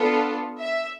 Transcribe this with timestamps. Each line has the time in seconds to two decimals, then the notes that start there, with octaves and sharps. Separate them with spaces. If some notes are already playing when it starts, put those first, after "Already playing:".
Already playing: B3 D4 F4 A4
0.59 E5